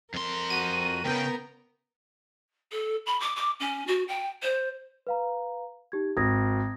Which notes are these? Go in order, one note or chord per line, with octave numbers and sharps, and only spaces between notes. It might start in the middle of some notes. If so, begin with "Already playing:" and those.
F2 A#4 C6
F#4 D#7
D2 C#3 B3 A#4 G5
A4
B5
D6
D6
C#4
F#4
G5
C5
B4 F5 A#5
D#4 G4 G#6
G#1 D#6 G#6 A#6